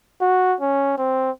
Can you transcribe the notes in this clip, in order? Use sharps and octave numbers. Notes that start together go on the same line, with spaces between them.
F#4
C#4
C4